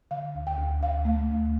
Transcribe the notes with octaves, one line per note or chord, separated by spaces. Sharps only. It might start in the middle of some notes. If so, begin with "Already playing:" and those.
D3 F5
D2
G5
D2
D2 F5
A3
D2